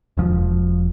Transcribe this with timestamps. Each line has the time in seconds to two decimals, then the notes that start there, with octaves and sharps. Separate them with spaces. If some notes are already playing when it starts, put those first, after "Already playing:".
0.17 E1 F3